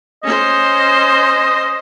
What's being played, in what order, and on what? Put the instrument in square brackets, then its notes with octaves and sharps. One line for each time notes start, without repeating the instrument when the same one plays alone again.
[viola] C#4 C5 [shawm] D#5